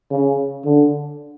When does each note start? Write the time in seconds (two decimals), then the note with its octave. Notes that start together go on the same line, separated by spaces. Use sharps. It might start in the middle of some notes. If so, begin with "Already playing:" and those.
0.10 C#3
0.65 D3